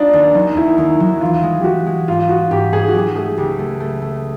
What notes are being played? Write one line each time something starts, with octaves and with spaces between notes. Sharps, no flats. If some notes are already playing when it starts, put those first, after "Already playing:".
Already playing: D4 D#4 F4
D#2
F#3 D#4
D#2 E4
D#2
F#3
E3 F4
G#3
G4
G#3 F#4
G#3
G#2 F4
G#3 F#4
G#2 G4
G#2 G#4
F#4
F#3 G4
A3 G#4
C#2 G4
A3
A3
A3